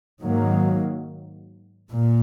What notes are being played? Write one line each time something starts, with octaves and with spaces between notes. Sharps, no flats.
G#2 D#3 F#3 A#3
A#2